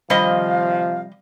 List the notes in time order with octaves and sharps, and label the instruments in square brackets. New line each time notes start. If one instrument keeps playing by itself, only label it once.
[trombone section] C3 F3 [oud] D#3 C5 [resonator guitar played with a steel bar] G3 D#5 [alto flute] F5